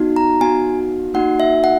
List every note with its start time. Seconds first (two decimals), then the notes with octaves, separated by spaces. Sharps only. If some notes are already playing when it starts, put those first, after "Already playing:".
Already playing: B3 D#4 F#4
0.16 A#5
0.41 B3 D#4 F#4 G#5
1.14 A#3 D#4 F#4 F#5
1.40 E5
1.64 F#5